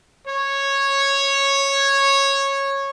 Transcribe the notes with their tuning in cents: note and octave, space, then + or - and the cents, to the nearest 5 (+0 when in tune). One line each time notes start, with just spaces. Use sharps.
C#5 -10